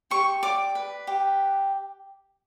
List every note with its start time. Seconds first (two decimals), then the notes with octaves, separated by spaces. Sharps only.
0.11 G4 C#6
0.43 D5 D6
0.75 B4
1.07 G4